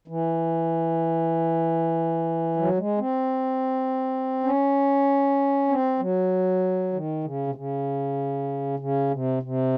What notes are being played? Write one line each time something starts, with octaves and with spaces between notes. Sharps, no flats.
E3
F#3
G#3
C4
C#4
C4
F#3
D#3
C#3
C3
C#3
C#3
C3
C3